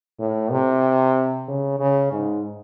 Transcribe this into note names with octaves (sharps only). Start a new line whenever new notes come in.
A2
C3
C#3
C#3
G#2